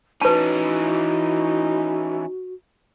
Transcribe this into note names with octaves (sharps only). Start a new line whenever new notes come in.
E3 C#4 D#4 F#4 B4 A5